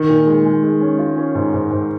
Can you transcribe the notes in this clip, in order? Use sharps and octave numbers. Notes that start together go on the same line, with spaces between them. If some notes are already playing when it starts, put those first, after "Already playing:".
Already playing: D#3
A#2
G#3
G#3
G#3
C#4
F4
C#4
G#2
G#2
G#2